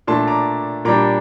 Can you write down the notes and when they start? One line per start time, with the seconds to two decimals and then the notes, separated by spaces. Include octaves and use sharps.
0.07 A#2 A3 D4 A5 C6
0.27 A#5 D6
0.85 A#2 G3 D4 A#5 D6